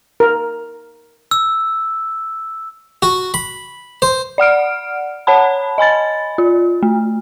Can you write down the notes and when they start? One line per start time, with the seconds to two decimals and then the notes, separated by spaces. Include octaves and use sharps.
0.20 A#4
1.31 E6
3.02 F#4
3.34 B5
4.02 C5
4.38 D5 F#5 F6 D7
5.27 C#5 F#5 A5 B5
5.78 D#5 G#5 B5 A6
6.38 F4
6.83 A3